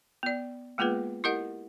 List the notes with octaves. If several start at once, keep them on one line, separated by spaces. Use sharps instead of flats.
B3 D5
G#3 A#3 B3 F4 G#4 B4
E4 G4 A#4 D#5 F#5